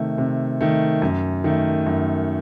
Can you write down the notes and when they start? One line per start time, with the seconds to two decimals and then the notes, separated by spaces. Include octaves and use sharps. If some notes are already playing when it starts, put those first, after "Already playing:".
Already playing: C3 D#3 A3
0.18 C3
0.61 D#3 A3
1.02 F#2
1.44 D#3 A3
1.87 F#2